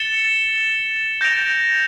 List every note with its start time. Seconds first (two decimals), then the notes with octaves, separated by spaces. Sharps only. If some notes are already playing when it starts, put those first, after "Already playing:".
Already playing: A6 C#7 E7 G7
1.21 G6 A#6 D7 F7